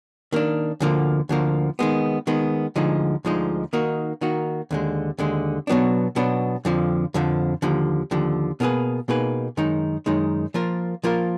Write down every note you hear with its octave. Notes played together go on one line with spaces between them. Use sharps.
D#3 A#3 D4
D2 D3 F3 A#3
D2 D3 F3 A#3
D#3 G#3 B3
D#3 G#3 B3
D2 D3 F3 G#3 D#4
D2 D3 F3 G#3 D#4
D#3 A#3 D#4 F#4
D#3 A#3 D#4 F#4
D#2 D3 G#3
D#2 D3 G#3
B2 F#3 B3 D4
B2 F#3 B3 D4
F2 D3 F3
F2 D3 F3
D#2 D3 F3
D#2 D3 F3
B2 A#3 D#4 G#4 B4
B2 A#3 D#4 G#4 B4
F#2 D#3 G#3 D#4
F#2 D#3 G#3 D#4
F3 A#3 F4 A#4
F3 A#3 F4 A#4